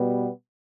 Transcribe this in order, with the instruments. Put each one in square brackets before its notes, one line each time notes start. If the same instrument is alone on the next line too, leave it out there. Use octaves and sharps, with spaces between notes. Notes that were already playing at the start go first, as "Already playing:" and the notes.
Already playing: [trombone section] B2 G3 B3